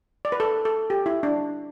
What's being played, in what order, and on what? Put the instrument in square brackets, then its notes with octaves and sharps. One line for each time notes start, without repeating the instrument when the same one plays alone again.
[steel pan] D5
B4
A4
A4
G4
E4
D4